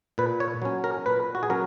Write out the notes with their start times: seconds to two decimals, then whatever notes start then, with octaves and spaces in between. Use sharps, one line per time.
0.18 A#2 B4
0.40 C#5
0.62 F#3 C#4
0.84 A#4
1.06 A#2 B4
1.35 F#4
1.43 G#4
1.50 F#3 C#4 A#4